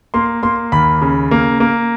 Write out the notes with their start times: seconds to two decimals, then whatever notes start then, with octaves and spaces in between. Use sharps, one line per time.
0.14 A#3 C6
0.43 A#3 C6
0.72 D#2 B5
1.02 C#3
1.31 A#3
1.60 A#3